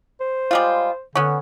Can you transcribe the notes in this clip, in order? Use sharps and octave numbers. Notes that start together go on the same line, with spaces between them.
C5
G3 G#3 F4
D3 B3 C#4